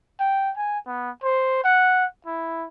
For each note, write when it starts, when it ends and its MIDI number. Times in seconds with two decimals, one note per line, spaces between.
0.20 0.51 79
0.57 0.79 80
0.87 1.11 59
1.24 1.61 72
1.64 2.05 78
2.27 2.67 64